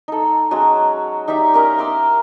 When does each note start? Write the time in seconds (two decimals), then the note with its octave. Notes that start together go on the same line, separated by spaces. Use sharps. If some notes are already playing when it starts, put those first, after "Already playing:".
0.08 D#4 A4
0.51 F#3 G#3 C#4 F#4
1.28 D#4 G4 D5 E5
1.54 A#3 C#4 A#4 D#5
1.78 C6 D6 E6